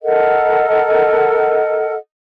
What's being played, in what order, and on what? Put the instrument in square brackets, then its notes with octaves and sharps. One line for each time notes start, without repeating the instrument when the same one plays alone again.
[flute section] A4 A#4 D#5 F#5